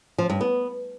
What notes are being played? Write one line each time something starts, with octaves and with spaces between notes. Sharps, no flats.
F3
G2
B3